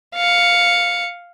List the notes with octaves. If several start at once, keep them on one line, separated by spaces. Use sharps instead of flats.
F5 C#7